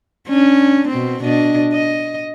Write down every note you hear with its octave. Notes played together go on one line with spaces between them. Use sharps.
C#4 D4
B2 C4
B2 D4 D#5
D#5